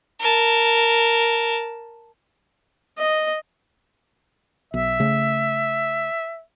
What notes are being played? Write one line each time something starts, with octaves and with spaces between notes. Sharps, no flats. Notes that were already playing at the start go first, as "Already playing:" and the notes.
A#4 A5
D#5
B1 E5
C#3 A3